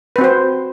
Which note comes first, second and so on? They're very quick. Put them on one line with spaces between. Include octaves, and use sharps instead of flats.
B4 C4 F#4 C5